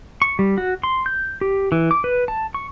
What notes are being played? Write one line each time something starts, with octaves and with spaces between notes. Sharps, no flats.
C#6
G3
F#4
C6
G6
G4
E3
D6
B4
A5
C#6